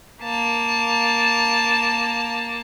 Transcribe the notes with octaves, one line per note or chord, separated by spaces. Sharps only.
A#3 A5